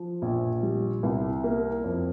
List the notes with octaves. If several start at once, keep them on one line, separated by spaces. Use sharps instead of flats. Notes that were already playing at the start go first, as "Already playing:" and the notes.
Already playing: F3
A#1
G3
C2
A#3
F2